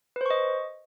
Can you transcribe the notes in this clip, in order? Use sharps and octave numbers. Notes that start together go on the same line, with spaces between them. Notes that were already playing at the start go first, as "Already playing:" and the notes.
B4 C5 D#5 C#6